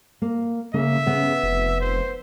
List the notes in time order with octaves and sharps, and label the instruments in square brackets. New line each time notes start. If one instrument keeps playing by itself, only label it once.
[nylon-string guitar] A#3
[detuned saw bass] C#3 [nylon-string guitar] A#3 [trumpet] E5
[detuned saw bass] C#3 [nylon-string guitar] B3
[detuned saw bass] F1
[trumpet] C5